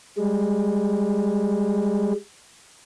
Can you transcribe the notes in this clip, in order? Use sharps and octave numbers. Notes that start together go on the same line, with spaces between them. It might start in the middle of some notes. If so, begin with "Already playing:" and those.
G3 G#3